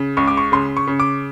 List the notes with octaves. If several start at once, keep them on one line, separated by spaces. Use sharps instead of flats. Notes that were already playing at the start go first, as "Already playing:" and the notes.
Already playing: C#3
C#2 C#6
D6
C#6
C#3 C6
C#6
C#3
D6